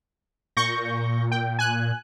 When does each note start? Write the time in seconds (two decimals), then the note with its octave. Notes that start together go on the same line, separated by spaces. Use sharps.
0.57 A#2 C#6 G6 A#6
1.31 G5
1.59 G#5 F#6